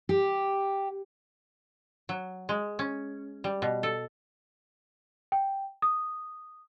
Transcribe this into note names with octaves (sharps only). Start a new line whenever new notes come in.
G4
F#3
G#3
C#4
G3
B2
A4
G5
D#6